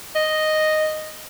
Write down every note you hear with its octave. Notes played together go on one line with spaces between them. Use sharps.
D#5